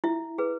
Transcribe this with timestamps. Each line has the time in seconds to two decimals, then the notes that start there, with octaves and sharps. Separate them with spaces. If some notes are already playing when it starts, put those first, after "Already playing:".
0.04 E4 E5
0.38 G#4 B4